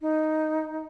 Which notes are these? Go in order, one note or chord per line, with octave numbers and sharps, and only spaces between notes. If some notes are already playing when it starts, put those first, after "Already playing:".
D#4